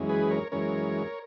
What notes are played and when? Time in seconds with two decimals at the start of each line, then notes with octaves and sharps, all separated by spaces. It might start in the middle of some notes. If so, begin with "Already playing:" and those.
Already playing: F#2 E3 G#3 C#4
0.09 G#4 B4
0.31 A#4 C#5
0.52 F#2 E3 G#3 C#4 A#4 C#5